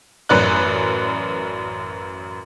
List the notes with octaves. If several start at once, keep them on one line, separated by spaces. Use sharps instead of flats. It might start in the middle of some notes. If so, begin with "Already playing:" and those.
A1 F#2 B4 D5 F#6